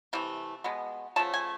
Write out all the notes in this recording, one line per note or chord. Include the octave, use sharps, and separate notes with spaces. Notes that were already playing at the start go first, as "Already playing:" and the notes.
C3 E3 A3
B2 G#3 B3
C#3 F3 A3 A5
G#5